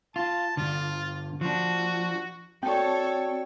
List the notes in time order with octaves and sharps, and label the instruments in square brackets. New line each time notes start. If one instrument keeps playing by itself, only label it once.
[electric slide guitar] F4 [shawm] A5
[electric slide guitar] G2 D3 [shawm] F4
[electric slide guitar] F3 D4 [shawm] F#4
[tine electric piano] C4 [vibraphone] F#4 D5 [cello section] A4 C#5 [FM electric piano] G5